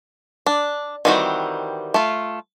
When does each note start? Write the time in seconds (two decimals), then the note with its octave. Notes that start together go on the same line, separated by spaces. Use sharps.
0.46 D4
1.05 D#3 E3 G3 C4 F#4
1.94 A3 F4